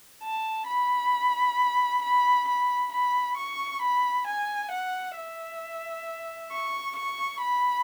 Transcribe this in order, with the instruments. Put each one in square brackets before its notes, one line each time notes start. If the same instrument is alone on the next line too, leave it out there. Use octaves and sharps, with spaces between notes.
[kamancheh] A5
B5
B5
B5
B5
C#6
B5
G#5
F#5
E5
C#6
C#6
B5